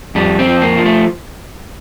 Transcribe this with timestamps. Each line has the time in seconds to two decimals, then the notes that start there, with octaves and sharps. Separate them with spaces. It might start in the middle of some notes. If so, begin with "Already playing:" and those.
0.15 F2 G3
0.39 C4
0.47 F2
0.62 A#3
0.77 F3
0.86 A3